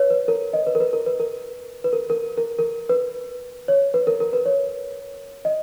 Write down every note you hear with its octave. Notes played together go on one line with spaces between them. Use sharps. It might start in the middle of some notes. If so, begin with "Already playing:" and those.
Already playing: B4 C#5
B4
A#4
D#5
B4
A#4
B4
A#4
B4
A#4
B4
A#4
A#4
A#4
A#4
B4
C#5
B4
A#4
A#4
B4
C#5
D#5